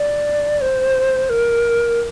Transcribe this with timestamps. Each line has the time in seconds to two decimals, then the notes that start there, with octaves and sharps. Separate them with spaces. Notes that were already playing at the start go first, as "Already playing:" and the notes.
Already playing: D5
0.61 C5
1.30 A#4